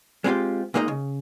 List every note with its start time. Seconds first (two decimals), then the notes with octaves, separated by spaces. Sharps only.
0.24 G#3 C4 C#4 E4 F4 G4
0.74 A#2 G#3 A#3 D#4 F#4 D#5
0.88 C#3